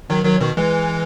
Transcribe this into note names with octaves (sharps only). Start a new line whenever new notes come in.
D#3 F#3
D#3 F#3
B2 D#3
E3 G#3